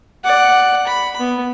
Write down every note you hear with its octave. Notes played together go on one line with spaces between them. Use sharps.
D5 F#5
B5
B3